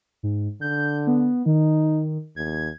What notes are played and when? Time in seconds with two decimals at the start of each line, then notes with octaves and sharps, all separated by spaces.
0.23 G#2
0.61 D3 G6
1.07 B3
1.46 D#3 D#4
2.36 D#2 G#6